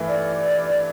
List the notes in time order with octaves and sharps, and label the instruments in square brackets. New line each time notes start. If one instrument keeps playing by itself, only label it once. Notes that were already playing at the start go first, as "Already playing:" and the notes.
Already playing: [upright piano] G2 E3 A3
[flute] D5